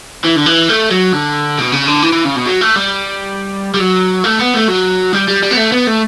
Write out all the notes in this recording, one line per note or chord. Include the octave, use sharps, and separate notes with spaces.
E3
D3
E3
A3
F#3
D3
B2
C#3
D3
E3
E3
C#3
B2
F#3
A3
G3
G3
F#3
A3
B3
A3
F#3
G3
G3
G3
B3
A3
B3
A3